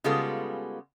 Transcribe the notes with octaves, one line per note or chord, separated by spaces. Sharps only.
C#3 G3 G#3 B3 F4 A4